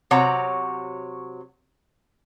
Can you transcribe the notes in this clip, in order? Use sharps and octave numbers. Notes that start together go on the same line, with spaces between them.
C3 F#3 C#5 F#5 A#5